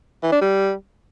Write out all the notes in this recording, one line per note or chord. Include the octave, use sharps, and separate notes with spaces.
E3
D4
G3